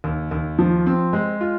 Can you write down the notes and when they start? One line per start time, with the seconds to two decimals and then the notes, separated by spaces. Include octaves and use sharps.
0.04 D#2
0.31 D#2
0.59 F3
0.86 C4
1.13 G#3
1.41 F4